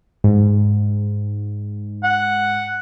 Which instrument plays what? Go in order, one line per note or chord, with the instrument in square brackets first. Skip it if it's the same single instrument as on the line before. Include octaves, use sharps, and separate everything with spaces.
[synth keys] G#2
[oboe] F#5